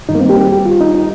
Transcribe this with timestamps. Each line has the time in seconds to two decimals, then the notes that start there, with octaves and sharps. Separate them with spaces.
0.09 G2 D#3 G3 D#4
0.15 A#3
0.20 C4
0.29 G4
0.41 G4
0.52 G4
0.65 F4
0.81 D#4
0.95 D#4